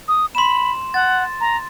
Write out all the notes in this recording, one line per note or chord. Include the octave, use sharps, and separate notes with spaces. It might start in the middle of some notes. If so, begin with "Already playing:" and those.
D#6
B5 C6 E7
F#5 A6
A#5